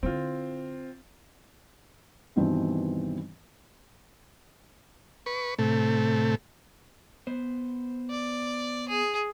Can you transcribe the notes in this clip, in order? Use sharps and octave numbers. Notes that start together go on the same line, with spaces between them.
D3 C4 E4 F4
G2 B2 D#3 E3 C4
B4 C#6
A2 C3 A3
B3 C5
D5
G#4